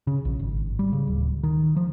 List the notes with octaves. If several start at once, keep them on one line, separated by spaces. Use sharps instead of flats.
C#3
A#1
G#1
G3
C#3
D1
D#3
F3